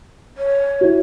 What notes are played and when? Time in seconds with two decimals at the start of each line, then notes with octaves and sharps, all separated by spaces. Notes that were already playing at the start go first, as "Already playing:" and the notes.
0.37 C#5
0.81 E4 F#4